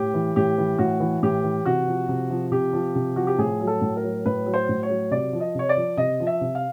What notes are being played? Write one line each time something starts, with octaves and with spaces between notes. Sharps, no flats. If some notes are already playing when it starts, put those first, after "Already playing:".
Already playing: A2 G4
E3
A2 G4
E3
A2 F#4
E3
A2 G4
E3
C3 F#4
F3
C3
F3
C3 G4
F3
C3
F3 F#4
G4
A2 G#4
F#3
A4
A2
A#4
F#3
A2 B4
F#3
C5
A2
C#5
F#3
C3 D5
F3
D#5
C3 C#5
D5
F3
C3 D#5
F3
E5
C3
F5